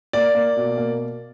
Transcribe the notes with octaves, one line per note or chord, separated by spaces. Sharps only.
A#3 D5
A#3
B2
A#3